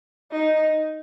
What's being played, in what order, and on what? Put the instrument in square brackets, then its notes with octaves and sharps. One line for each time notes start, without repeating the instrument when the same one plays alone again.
[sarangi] D#4